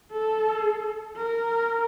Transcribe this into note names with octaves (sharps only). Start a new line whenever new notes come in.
A4
A#4